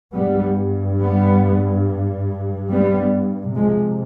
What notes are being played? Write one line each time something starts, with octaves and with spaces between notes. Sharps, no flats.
G2 G3 B3
G3 B3
G3 B3
F2 C3 F3 G#3